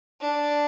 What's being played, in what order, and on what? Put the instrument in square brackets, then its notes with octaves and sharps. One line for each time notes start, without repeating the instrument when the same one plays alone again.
[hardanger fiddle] D4